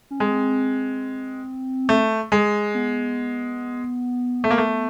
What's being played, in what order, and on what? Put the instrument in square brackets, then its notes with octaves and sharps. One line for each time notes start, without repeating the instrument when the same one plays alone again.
[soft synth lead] C#4
[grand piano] G#3 [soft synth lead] C4
[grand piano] A3
G#3
[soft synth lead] B3
[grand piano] A3
A#3
A3